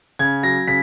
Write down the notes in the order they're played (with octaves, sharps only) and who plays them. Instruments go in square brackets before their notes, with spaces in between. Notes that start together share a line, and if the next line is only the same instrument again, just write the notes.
[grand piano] C#3 G#6
F#3 A#6
C#3 B6